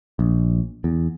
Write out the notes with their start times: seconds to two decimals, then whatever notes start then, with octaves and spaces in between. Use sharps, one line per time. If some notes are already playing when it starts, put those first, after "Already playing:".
0.19 A#1
0.84 E2